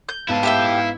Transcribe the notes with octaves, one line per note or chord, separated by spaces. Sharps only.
G6
G#2 B3 E4 F5 A5
G4 E5 G5